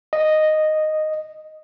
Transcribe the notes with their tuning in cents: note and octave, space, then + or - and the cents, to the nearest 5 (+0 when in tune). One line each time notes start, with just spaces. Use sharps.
D#5 -5